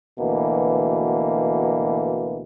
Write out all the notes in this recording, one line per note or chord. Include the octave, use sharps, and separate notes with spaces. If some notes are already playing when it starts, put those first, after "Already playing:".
D2 B2 E3 A#3